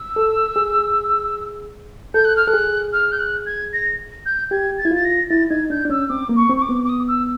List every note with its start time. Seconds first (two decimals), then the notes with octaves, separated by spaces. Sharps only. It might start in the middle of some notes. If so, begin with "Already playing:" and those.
Already playing: E6
0.16 A4
0.56 G#4
2.14 A4 G6
2.25 F#6
2.37 F6
2.47 A4 F#6
2.54 G#4
2.93 F6
3.12 G6
3.19 F#6
3.46 G#6
3.73 A#6
4.26 G6
4.51 G4 G#6
4.78 A6
4.85 E4 G#6
4.91 F4 A6
5.05 A#6
5.30 E4 A6
5.50 D#4 G#6
5.70 D4 G6
5.85 D4
5.90 C#4 E6
6.09 C4 D6
6.29 A#3
6.36 C#6
6.49 C4
6.57 C#6
6.62 D6
6.69 B3
6.84 D6
6.89 D#6
7.08 E6